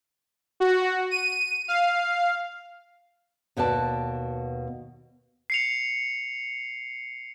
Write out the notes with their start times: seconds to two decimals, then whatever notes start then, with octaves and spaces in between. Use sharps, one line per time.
0.60 F#4
1.11 D#7
1.68 F5
3.57 D#2 B2 B4 D5 A5
5.50 C7 C#7 F7